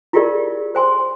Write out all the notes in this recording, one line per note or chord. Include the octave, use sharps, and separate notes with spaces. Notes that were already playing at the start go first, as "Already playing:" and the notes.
E4 F4 G4 G#4 A#4 D5
C5 G#5 C6